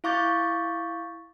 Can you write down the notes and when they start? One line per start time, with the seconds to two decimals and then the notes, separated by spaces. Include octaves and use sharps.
0.04 E4 F5 C#6 D6 G6 A6